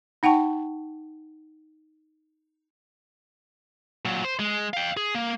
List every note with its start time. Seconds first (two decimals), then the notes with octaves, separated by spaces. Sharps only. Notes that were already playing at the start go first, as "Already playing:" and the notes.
0.23 D#4 F#5 G5 A5 C#6
4.05 A#2 F#3
4.24 C5
4.39 G#3
4.74 F5 G5
4.97 G#4
5.15 A#3